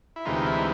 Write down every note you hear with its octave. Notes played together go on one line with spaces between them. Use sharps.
E4
D2 C3 E3 G#3 D#4 F4
E4
D#4